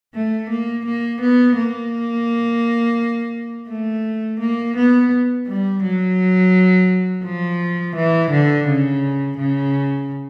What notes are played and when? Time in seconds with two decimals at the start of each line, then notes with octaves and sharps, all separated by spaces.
0.14 A3
0.50 A#3
0.86 A#3
1.21 B3
1.56 A#3
3.69 A3
4.40 A#3
4.76 B3
5.47 G3
5.83 F#3
7.25 F3
7.96 E3
8.31 D3
8.67 C#3
9.37 C#3